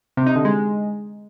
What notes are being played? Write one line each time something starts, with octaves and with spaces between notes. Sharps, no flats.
C3
D#4
D3
G#3